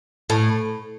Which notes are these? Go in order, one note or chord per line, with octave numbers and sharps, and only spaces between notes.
A2